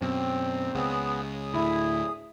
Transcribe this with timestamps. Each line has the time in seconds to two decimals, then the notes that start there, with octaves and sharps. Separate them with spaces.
0.02 F#2 B2 C4
0.75 C#2 B3 G#4
1.24 G#4 D#6
1.54 D2 A2 E4